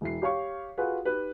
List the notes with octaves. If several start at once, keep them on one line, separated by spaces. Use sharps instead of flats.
E1 E4 C7
G4 C#5 F5 C#6
F4 F#4 G#4 A4 B4
D#4 G4 B4